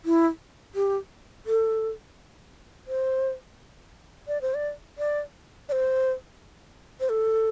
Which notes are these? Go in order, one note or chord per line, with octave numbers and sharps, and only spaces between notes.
E4
G4
A4
C5
D5
C5
D5
D5
D5
C5
C5
A4